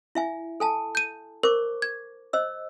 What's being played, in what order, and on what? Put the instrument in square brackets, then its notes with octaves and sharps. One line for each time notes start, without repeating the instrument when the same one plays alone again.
[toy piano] E4 E5 G#5
A4 G#5 A5
[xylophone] G6 D#7
[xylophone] A#4 [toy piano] C5 C#6 D6
[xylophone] G#6
[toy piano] C5 D#5 E6